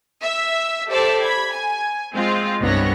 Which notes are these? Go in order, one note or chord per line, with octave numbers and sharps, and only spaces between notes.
E5
G4 A4 C5 D5 E5 A5
B5 G#6
G#5
G#3 C4 F4
C2 G2 B3 C#5 A#6